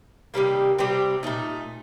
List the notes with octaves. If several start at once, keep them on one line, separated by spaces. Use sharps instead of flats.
C3 D#3 G3 A#3
C3 G3 C4 G4
A#2 A3 D#4